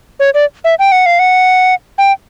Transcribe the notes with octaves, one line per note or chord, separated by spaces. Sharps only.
C#5
D5
E5
G5
F#5
F5
F#5
G5